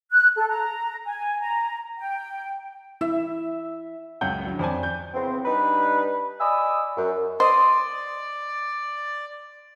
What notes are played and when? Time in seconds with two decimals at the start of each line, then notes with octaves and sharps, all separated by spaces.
0.12 F#6
0.37 A4
0.48 A#5
1.05 G#5
1.39 A#5
1.98 G5
3.01 E4 E5
4.21 C#2 F#2 C#4 F#5 G5 G6
4.47 D3 F#3
4.59 F2 C5 D5 G#5
4.83 G6
5.14 C#3 E3 B3 C4
5.45 G3 D4 D#4 B4
6.40 D5 D#5 G#5 B5 D#6 E6
6.97 F#2
7.40 C5 D5 D#5 C6 D#6